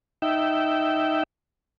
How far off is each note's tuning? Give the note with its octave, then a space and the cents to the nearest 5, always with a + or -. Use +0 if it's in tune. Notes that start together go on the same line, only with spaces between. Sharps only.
D#4 +0 E5 +0 G5 -20